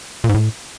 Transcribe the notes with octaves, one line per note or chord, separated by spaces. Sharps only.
A#2
G#2
A2